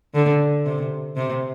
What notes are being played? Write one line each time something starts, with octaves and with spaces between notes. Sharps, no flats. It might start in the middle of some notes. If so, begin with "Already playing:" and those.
D3
C3
C3